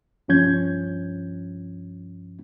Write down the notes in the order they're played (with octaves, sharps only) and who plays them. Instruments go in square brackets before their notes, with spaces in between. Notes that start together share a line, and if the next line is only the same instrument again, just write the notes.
[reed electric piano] C2 G2 F3 C#4 G6 G#6